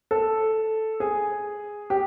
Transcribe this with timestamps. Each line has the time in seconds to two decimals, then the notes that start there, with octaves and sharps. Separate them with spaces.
0.11 A4
1.00 G#4
1.90 G4